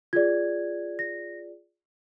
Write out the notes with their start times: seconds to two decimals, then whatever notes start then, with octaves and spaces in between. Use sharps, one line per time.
0.13 F4 G#4 D5 G#6
0.99 A#6